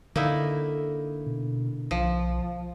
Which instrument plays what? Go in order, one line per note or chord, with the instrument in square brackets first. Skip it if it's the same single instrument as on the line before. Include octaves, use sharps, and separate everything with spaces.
[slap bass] D3 [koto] A#3 D#4 E4
[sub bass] B2
[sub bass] B1 [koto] F3